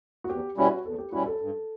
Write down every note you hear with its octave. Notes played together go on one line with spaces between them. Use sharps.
F#4
E2 G4
B2 G3 C#4 E4 F#4
E2 A4
G4
B2 G3 C#4 E4 F#4
A4
G2